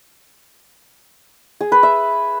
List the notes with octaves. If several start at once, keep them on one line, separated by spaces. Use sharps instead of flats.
G#4
B4
E5